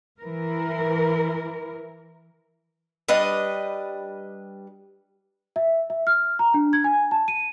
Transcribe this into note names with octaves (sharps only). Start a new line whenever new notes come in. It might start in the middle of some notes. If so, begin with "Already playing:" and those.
E3 A#4
G3 D4 B4 D#5
E5
E5
F6
A#5
D4
G#6
G#5
A5
D#7